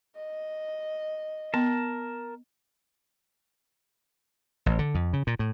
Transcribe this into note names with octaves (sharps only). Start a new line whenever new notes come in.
D#5
B3 A#4 A5 C6
A1
D3
F2
C#3
A#2
A2